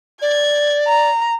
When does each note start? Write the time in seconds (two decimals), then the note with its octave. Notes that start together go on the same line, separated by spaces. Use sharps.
0.22 D5 G#6
0.87 A#5